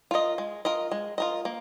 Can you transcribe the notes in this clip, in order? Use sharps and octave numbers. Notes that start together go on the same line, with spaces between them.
F4 A#4 D#5
G#3
F4 A#4 D#5
G#3
F4 A#4 D#5
A#3